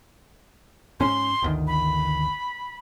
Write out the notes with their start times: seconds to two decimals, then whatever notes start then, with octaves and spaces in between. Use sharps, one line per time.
1.00 G#2 C#4 C6
1.42 G1 D2 D#3
1.67 B5